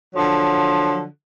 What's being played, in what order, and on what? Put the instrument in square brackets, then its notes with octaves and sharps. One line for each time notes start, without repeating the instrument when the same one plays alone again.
[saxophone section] D3 F3 F#3